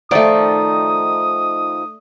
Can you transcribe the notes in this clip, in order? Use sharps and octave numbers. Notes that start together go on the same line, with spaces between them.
D#3 F3 A3 D#4 D5 D#6